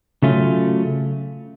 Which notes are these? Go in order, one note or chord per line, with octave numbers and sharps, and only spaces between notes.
C#3 F#3 A3 C#4 F4